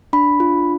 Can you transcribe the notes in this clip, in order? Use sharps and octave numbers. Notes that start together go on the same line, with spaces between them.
D4 B5
F4